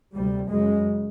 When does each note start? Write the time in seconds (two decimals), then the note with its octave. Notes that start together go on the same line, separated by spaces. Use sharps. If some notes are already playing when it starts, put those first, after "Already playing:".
0.14 D2 C3 G3
0.50 F#2 C#3 G#3